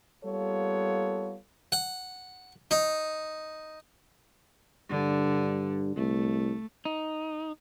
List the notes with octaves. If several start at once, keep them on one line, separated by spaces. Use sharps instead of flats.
G3 A#3 B3 F4 A4 C#5
F#5
D#4
G2 D3
C2 A3
D#4